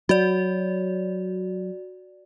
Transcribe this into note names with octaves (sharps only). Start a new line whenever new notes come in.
F#3 F#4 D5